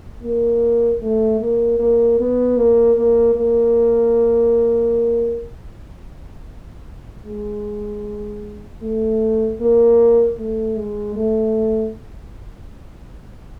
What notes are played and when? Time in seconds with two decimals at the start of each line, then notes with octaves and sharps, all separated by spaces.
0.23 A#3
1.02 A3
1.40 A#3
1.79 A#3
2.19 B3
2.57 A#3
2.97 A#3
3.35 A#3
7.26 G#3
8.82 A3
9.60 A#3
10.38 A3
10.77 G#3
11.16 A3